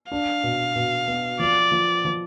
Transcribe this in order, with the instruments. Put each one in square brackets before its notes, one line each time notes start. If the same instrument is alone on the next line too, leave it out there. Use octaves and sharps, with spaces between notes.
[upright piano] D4 [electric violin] F5
[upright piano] B2
B2
B3
[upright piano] F3 [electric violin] D5
[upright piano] F3
F3